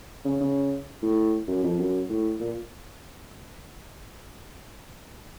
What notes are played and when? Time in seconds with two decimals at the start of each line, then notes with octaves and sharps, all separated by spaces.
0.25 C#3
0.41 C#3
1.02 A2
1.48 F#2
1.63 F2
1.78 F#2
2.09 A2
2.40 A#2